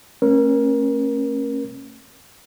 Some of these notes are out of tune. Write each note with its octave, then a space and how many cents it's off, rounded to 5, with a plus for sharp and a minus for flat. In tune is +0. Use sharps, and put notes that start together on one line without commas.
A3 +35 C#4 -30 A#4 +25